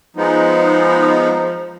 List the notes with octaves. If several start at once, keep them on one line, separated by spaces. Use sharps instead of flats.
F3 G#3 B3 D#4